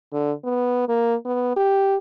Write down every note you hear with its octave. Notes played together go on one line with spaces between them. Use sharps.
D3
B3
A#3
B3
G4